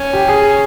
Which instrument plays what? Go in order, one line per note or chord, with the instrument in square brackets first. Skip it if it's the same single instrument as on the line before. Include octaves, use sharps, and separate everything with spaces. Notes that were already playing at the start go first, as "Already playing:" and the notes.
Already playing: [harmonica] C#4
[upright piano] G4
G#4